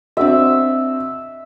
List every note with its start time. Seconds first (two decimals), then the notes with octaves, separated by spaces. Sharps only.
0.17 C4 D4 F#4 E5